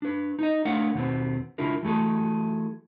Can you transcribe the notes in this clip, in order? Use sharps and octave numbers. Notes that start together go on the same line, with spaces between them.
D4 B4
D#4 D#5
A3 D4 A#4 C#5 F5 F#5
D#2 B2 B3 C4
C#2 D4 E4 F4 A#4
E3 F#3 A3 G#4 A4